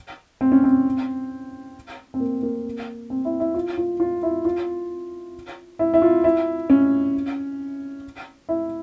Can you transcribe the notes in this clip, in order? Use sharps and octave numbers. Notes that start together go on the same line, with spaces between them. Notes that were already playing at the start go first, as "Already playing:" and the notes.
C4
C#4
C4
C4
A#3
A#3
C4
E4
E4
F4
F4
F4
E4
F4
E4
E4
F4
E4
C#4
E4